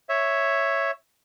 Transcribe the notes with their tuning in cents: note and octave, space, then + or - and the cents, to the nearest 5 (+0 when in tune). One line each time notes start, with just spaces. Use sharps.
C#5 +0 E5 +0